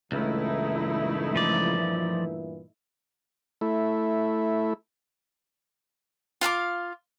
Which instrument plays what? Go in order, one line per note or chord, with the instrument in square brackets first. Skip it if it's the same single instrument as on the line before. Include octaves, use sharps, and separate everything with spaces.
[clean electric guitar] C#2 [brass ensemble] G2 A#2 E3 [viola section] A3 D#4 E4
[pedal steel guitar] F3 D5
[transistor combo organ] A3 E4
[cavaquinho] F4 F5 A5 D6